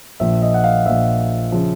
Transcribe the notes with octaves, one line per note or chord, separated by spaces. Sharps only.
A#1 A#2 F3 E5
D#5
F#5
F5
A#1 A#2 F3 E5
C#3 F3